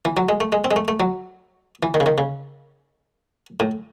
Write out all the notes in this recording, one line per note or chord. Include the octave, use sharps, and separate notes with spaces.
E3
F#3
G#3
A3
G#3
C4
G#3
A3
A3
F#3
E3
D#3
C#3
D#3
C#3
A2